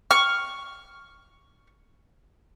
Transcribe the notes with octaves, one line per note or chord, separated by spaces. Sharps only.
C#6 F6